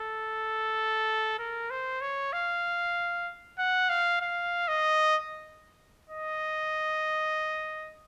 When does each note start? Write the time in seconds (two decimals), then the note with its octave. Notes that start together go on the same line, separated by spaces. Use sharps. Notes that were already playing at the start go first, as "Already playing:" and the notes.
Already playing: A4
1.38 A#4
1.70 C5
2.01 C#5
2.33 F5
3.58 F#5
3.89 F5
4.21 F5
4.68 D#5
6.09 D#5